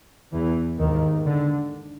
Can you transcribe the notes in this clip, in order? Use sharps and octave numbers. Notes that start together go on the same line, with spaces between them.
E2 E3
D#2 G#2 D#3
D3